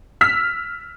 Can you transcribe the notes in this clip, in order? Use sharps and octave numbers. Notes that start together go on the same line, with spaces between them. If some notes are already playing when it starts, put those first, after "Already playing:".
E6 F6 B6